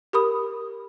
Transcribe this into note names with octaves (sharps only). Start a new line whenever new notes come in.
G4 A#4 B5 D#6